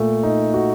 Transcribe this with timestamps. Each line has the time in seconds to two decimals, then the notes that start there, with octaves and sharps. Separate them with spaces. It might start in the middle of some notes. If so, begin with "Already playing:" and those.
Already playing: A#2 A3
0.23 D#4
0.54 F#4